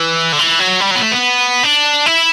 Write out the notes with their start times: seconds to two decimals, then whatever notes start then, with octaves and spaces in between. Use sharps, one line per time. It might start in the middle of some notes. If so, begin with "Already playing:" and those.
Already playing: E3
0.33 D3
0.39 E3
0.60 F#3
0.81 G3
0.91 F#3 B3
1.01 A3
1.12 B3
1.63 D4
2.06 E4